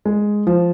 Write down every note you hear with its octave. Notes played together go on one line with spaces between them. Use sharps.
G#3
F3